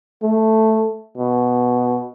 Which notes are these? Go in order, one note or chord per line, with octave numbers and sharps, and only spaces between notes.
A3
B2